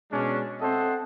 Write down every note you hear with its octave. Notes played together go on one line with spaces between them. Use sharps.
B2 G#3 C#4 D4
C4 A4 C5 D#5 E5 F#5